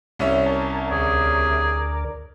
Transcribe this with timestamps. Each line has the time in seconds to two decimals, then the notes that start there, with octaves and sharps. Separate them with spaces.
0.19 C2 C#4 E5
0.46 A#4 G#5 A5
0.91 D2 G#4 A#4 D5